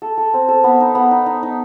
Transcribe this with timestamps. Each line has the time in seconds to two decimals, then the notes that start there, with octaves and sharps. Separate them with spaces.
0.02 A4
0.18 A4
0.34 C4
0.48 A4
0.64 B3
0.80 D#4
0.95 B3
1.11 D#4
1.26 D#4
1.43 D#4